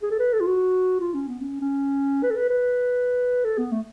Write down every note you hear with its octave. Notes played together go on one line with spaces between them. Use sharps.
G#4
A4
B4
A4
F4
F#4
F4
C#4
B3
C#4
C#4
B4
A4
B4
B4
A4
B3
A3